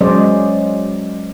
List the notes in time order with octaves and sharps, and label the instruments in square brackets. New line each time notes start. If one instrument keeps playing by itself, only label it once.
[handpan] F#3 G#3 C#4 C5 D5 D#5